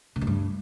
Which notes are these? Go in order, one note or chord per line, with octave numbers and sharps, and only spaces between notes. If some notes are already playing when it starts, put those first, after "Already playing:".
C3
B2
G2